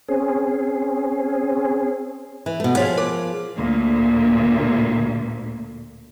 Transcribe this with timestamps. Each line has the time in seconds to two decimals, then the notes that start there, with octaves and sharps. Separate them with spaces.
0.09 C4 C#4 G#4
2.46 E3
2.60 B2 A3
2.77 F3 G#4 C#5 F5 B6
2.98 A#4 D6
3.56 D2 A#2